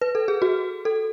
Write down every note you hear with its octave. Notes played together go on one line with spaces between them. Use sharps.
B4
A4
G#4
F#4
A4